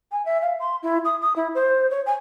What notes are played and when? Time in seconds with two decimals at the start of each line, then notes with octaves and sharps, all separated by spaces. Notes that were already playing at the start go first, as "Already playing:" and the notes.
0.12 G#5
0.25 E5
0.42 F5
0.60 C6
0.83 E4
1.05 D#6
1.21 D#6
1.36 E4
1.55 C5
1.90 C#5
2.06 G#5